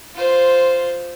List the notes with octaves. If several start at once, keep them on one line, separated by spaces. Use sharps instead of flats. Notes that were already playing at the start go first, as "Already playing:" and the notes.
F4 C5